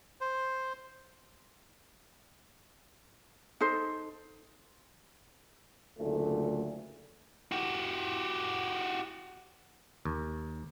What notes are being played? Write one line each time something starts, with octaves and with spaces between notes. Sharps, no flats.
C5
D#4 A4 C5
F#1 D2 A#2 A3
F#4 G4
D#2